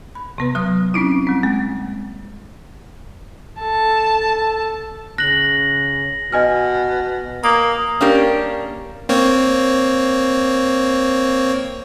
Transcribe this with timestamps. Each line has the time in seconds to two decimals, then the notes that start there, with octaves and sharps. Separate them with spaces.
0.15 B5
0.38 C3 B3 B4
0.55 F#3 D#6 F6
0.94 C4 C#4 D#4 E4
1.27 G3 C4
1.43 G#3 A#3
3.59 A4 A5
5.18 C#3 F#6 A#6 F#7
6.32 B2 D#5 G#5 F6
7.44 A#3 D#6
8.01 A#3 C#4 D4 G4 A#4
9.09 A#3 C4 C#5